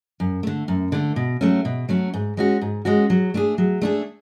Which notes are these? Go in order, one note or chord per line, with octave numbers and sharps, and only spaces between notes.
F#2
D3 A3
F#2
D3 A3
B2
F#3 A3 C#4
B2
F#3 A3 C#4
G#2
G#3 C#4 F#4
G#2
G#3 C#4 F#4
F#3
A3 D4 G#4
F#3
A3 D4 G#4